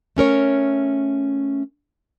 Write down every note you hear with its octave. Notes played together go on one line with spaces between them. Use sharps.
A3 C#4 A#4 C#5